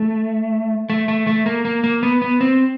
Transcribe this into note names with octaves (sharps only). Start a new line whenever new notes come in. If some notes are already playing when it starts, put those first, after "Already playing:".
Already playing: A3
A3
A3
A3
A#3
A#3
A#3
B3
B3
C4